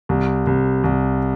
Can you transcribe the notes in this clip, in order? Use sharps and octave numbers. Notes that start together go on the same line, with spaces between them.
C2
C2
C2